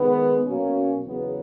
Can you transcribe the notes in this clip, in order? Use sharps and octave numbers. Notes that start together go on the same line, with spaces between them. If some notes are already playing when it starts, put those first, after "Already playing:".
Already playing: D#3 G#3 B3
B2 F#3 A#3 C#4
E2 C#3 F#3 B3